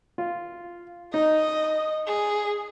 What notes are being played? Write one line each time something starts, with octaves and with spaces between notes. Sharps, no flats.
F4
D#4 D#5
G#4